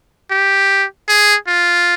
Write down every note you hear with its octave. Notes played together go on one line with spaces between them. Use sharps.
G4
G#4
F4